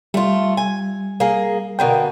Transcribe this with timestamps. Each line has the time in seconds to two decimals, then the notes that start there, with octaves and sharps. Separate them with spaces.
0.14 G3 A3 F4
0.57 G#5
1.20 A#3 G#4
1.79 B2 D3 A#3 A#4 G5